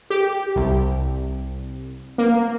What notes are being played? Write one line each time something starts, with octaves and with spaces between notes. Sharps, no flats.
G4
C2
A#3